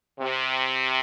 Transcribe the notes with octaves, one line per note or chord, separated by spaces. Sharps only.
C3